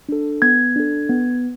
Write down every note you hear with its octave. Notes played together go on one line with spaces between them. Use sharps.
D4 A4
B3 G#6
D4 A4
B3